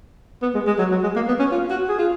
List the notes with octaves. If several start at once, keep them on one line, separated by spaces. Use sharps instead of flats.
B3
G#3
G#3
F#3
F#3
G#3
A#3
B3
C#4
F4
F#4
G#4
F4